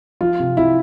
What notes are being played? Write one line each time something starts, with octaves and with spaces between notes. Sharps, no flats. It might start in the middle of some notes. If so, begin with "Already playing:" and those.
F3 F4
C3
C3 E4